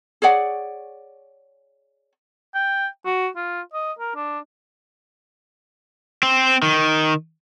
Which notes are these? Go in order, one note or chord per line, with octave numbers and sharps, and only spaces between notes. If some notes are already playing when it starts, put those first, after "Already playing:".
G#4 C#5 D5 F#5
G5
F#4
F4
D#5
A#4
D4
C4
D#3